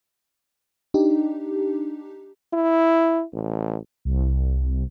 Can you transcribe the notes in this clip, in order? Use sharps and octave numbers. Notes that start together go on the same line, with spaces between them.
D4 D#4 G4
E4
A1
C2